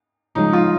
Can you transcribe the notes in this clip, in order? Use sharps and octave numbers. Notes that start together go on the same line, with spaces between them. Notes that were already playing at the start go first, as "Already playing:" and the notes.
C#3 F3 G#3 D#4
F4